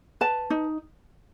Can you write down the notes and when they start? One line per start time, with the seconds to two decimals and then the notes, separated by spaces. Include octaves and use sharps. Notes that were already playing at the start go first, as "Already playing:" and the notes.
0.21 B4 A5
0.50 D#4